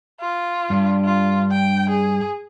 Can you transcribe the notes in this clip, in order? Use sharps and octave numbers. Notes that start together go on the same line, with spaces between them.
F4
G2 D4
F4
G5
G#4